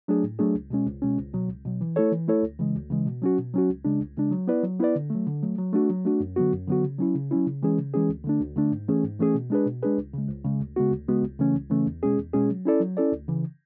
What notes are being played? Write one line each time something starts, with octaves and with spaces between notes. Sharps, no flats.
F#3 A3 D4 G#4
A2
F#3 A3 D4 G#4
C#2
B2 G#3 C#4
C#2
B2 G#3 C#4
C#2
B2 F#3
C#2
B2 F#3
E3
A3 E4 A4 C#5
E3
A3 E4 A4 C#5
D2
C#3 E3 G#3
D2
C#3 E3 G#3
B2
F#3 C#4 F#4
B2
F#3 C#4 F#4
C#2
C#3 G#3 D4
C#2
C#3 G#3 D4
F#3
B3 E4 B4 D5
F#3
B3 E4 B4 D5
D3
F#3 A3
D3
F#3 A3
F#3
A3 D4 F#4
F#3
A3 D4 F#4
F#2
D3 F#3 B3 F#4
F#2
D3 F#3 B3 F#4
C#3
F#3 C#4 E4
C#3
F#3 C#4 E4
C#3
E3 G#3 C#4 G#4
C#3
E3 G#3 C#4 G#4
D2
D3 A3 D4
D2
D3 A3 D4
G#2
E3 A3 C#4 G#4
G#2
E3 A3 C#4 G#4
B2
G#3 D4 G#4 B4
B2
G#3 D4 G#4 B4
C#2
C#3 G#3
C#2
C#3 G#3
D2
C#3 G#3 B3 F#4
D2
C#3 G#3 B3 F#4
C#2
C#3 E3 A3 C#4
C#2
C#3 E3 A3 C#4
E2
B2 G#3 C#4 G#4
E2
B2 G#3 C#4 G#4
F#3
C#4 E4 A4 D5
F#3
C#4 E4 A4 D5
D2
C#3 E3